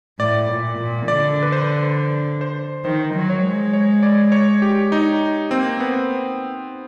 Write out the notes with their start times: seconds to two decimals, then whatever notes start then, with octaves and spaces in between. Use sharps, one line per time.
0.19 A2 D5
0.50 A#2
0.78 A#2
1.08 D3 D5
1.42 B4
1.52 C5
2.41 C5
2.85 D#3 C5
3.14 F#3
3.30 C#5
3.44 G#3
3.73 C#5
4.03 D5
4.32 C#5
4.62 G4
4.92 D#4
5.51 A#3 C4
5.80 B3